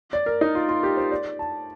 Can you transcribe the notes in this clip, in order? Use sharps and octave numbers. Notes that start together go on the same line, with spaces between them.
D5
A#4
D#4
F4
F4
G4
C5
D5
A5